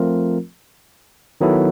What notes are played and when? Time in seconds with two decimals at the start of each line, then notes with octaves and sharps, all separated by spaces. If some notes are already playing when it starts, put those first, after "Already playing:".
Already playing: F3 A3 C4 F4 A#4
1.41 D#3 F#3 B3 E4 A4